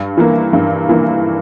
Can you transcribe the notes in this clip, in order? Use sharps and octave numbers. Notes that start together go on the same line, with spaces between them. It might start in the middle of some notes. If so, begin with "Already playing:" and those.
Already playing: G2
E3 A#3
G2
E3 A#3